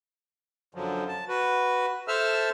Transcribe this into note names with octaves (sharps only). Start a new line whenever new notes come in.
F#2 D3 F3 F#3
A5
F#4 B4
A4 C5 E5 A5 E6 F6